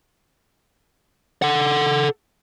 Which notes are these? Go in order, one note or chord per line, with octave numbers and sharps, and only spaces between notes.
A4 F#5